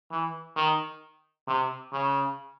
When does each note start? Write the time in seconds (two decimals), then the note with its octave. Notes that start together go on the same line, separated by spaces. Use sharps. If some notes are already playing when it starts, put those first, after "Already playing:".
0.10 E3
0.56 D#3
1.47 C3
1.92 C#3